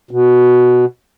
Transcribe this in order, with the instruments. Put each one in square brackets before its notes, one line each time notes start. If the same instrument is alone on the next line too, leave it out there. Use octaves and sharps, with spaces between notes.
[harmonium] B2